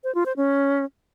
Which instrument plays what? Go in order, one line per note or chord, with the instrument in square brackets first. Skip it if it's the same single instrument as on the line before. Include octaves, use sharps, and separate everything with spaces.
[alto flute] C5
F4
C5
C#4